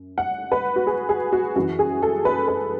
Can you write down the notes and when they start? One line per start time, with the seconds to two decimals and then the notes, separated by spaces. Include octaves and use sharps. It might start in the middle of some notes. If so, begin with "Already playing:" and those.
Already playing: F#2
0.18 F#5
0.52 B4
0.76 F#4
0.87 G#4
1.09 G#4
1.32 F#4
1.56 F#2 F#4
1.59 E3
1.79 G#4
2.03 A4
2.25 B4
2.48 B4